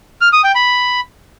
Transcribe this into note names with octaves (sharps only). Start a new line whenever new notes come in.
F6
D#6
G5
B5